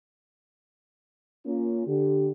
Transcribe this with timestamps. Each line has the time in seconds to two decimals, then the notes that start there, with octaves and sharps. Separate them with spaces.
1.45 A#3 C#4 F4
1.87 D3 G4